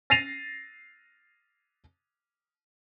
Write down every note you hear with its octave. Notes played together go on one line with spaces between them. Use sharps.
A6 A#6 C7 D#7 F7